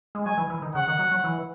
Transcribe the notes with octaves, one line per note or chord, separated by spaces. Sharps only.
G#3
F#3 G#5
E3
E3
D#3
C#3 F#5
D#3
F#3
F#3
E3